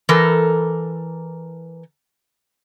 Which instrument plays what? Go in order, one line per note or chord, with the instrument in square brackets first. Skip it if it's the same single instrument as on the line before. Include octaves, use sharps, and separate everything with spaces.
[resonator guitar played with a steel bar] E3 A4 A#4